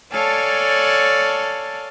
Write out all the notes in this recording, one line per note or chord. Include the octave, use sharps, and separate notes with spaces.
A4 C#5 D5 F5 G#5 A5